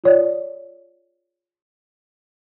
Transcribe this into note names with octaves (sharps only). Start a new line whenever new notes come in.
F4 C#5 D5